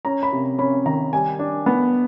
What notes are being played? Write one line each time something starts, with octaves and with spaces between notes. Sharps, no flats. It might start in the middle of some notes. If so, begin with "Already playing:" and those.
C#4 A#5
B5
C3
C#4 B5
D#3 A#5
G3 G#5
D4
B3